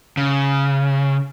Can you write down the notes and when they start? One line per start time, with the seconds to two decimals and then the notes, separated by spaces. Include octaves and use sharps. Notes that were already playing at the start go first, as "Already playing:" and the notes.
0.17 C#3